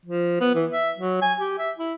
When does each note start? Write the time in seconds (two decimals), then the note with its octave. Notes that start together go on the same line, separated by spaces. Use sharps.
0.06 F3
0.40 B3
0.55 E3
0.72 E5
0.98 F#3
1.22 G#5
1.40 G4
1.59 E5
1.78 E4